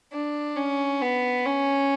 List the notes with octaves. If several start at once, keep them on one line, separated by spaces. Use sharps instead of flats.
D4
C#4
B3
C#4